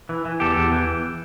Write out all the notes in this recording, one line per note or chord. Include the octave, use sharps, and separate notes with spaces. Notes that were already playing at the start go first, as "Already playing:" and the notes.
E3
E3
E2 G4 A4
E2
E3